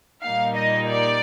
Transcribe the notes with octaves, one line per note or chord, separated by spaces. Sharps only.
A#2 G3 A#3 D#4 F5
D#5
D5